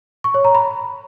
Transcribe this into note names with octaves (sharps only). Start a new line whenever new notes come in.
C#6
C#5
A#5
B5